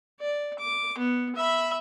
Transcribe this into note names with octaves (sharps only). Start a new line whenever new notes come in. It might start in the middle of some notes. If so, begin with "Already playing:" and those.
D5
D6
B3
E5 B5